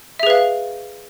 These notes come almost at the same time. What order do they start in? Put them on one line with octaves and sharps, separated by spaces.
E5 G#4 B4 F5